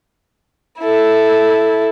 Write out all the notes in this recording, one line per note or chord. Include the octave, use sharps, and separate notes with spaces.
E4 A4